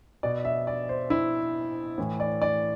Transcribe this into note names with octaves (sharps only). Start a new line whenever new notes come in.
B2 D5
E5
D5
C5
E4
A2 E3
D5
D5